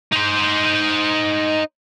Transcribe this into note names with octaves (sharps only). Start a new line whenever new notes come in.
D#4 C5